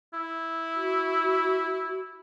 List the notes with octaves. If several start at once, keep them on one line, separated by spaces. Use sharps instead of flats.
E4
F#4